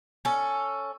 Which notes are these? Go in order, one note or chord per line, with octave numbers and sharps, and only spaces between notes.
C#4 A4